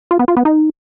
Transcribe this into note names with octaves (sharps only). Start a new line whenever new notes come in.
F4
B3
F4
B3
D#4